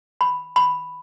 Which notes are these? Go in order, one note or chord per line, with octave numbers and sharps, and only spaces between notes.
B5
B5